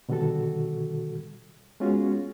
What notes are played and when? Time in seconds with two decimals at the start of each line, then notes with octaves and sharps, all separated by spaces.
0.09 B2 D3 D#3 G3 F#4 A4
1.80 G#3 B3 C#4 F4 F#4 G#4